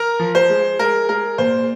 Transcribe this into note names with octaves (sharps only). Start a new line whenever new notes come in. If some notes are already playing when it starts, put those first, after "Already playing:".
Already playing: A#4 A#5
F3
C5
G#3
G#3 A#4
G#3 A#4
A#2 C5